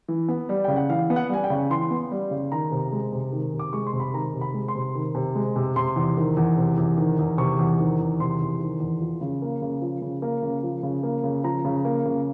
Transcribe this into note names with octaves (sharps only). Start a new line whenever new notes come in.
E3
B3
G3
C#3 G5
F#5
E3 F5
B3
F#5
G3 G#5
G5
C#3
E3 C6
B3
G3
C#3
D#3 A#5
C3
G#3
C3
D#3
C3
D6
G#3 C#6
C6
C3
B5
D#3 A#5
C3
B5
G#3
C6
C3
D#3
C3
G#3
C3
C3 C6
E2
D#3
E2
C3
E2
D#3
E2
C3 C#6
E2
D#3
E2
C3 C6
E2
D#3
E2
F3
C#3
A#3
C#3
F3
C#3
A#3
C#3
F3
C#3
A#3
C#3
F3 A#5
C#3
A#3
C#3